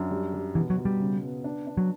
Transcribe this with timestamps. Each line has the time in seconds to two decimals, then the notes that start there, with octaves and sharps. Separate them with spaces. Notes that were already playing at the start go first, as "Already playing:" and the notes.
Already playing: F#2 D4
0.11 G3
0.34 G3
0.55 B2 E3
0.70 F#3
0.77 B2
0.85 G3
1.00 C#3
1.23 B3
1.44 D4
1.67 D4
1.77 F#3